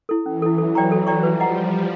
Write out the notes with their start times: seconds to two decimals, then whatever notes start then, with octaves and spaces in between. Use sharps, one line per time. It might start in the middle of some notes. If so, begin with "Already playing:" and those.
0.09 E4 A4
0.25 E3 C#4
0.42 E4 A4
0.58 E3 F#3 A4
0.75 D5 G5 A#5 C#6
0.92 A4
1.07 D5 G5 A#5 C#6
1.23 F3 G3 B4
1.40 D#5 F#5 A#5